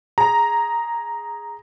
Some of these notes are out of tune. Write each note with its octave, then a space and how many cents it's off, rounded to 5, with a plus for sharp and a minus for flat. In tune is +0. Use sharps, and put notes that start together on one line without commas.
G#4 +0 A#5 -5